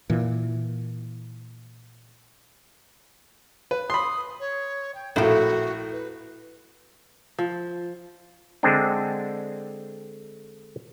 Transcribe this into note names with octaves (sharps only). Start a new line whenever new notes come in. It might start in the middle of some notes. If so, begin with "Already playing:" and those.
A#2 E3
B4
B5 C6 D#6
C#5
G5
A#1 A2 E4 F#4 A4
B4
F3
D3 G#3 C4 D4